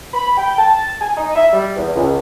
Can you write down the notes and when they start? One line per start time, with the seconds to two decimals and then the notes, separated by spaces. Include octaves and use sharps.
0.14 B5
0.37 G5
0.58 A5
1.01 G#5
1.17 D#4
1.36 E5
1.53 G3
1.76 E2
1.96 C#2